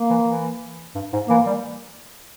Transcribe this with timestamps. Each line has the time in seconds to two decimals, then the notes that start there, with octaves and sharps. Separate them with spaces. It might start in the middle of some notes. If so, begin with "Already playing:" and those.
Already playing: A#3
0.10 E3
0.27 E3
0.95 G2
1.13 G#2
1.29 E3 A#3
1.46 G3